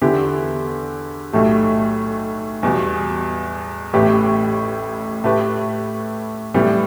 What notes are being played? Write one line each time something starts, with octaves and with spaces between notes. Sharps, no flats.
E2 D3 B3 E4 G4
B1 A2 A3 G4
E2 B2 G3
A1 A2 A3 G4 B4
A2 A3 G4 B4
A2 E3 G3 B3